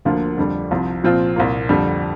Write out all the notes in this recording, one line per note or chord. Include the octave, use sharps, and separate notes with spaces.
D2 D3 F3 A#3 F4
F2 D3 G3 D4
C2 C3 F3
A#2 F3 C4 F4
C2 A#2 A#3
F2 D3 G3